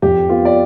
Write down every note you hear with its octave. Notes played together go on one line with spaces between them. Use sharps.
F2 G4
B3 F4
D5